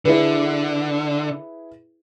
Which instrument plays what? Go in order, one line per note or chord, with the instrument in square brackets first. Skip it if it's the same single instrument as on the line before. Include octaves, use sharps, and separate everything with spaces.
[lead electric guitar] D3 [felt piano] E4 G#4 B4